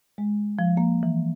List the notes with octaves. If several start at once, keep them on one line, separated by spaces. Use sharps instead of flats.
G#3
F3
A#3
E3